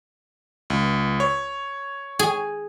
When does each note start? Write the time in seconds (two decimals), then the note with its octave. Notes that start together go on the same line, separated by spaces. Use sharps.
0.70 C#2
1.20 C#5
2.19 G#4